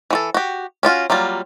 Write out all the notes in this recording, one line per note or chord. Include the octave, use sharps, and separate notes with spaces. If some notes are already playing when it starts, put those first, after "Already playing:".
E3 F#4 A4
F#4 G4
C#4 D4 F4 F#4
F#3 G3 A#3 F4